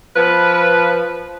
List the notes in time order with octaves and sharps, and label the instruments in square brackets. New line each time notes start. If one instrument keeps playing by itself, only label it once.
[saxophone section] F3 B4